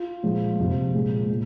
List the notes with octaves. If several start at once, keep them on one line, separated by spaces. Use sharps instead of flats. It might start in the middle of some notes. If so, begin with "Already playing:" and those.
Already playing: F4
A#2 F3 G#3
F2 C3 F3 G#3
A#2 G#3
A#2